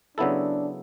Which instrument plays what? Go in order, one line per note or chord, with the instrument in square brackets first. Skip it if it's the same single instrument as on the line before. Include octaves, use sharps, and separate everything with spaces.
[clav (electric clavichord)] C#3 F#3 B3 E4 A4 [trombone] D4